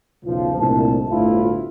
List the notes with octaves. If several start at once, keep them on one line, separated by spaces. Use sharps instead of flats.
B1 E2 C#3 F3
C2 G2 A#2 A3 D#4 A5
G1 D2 A2 A3 E4 F4